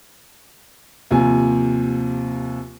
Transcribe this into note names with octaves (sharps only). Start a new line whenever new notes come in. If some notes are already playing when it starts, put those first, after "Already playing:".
D#2 C3 F3 G#5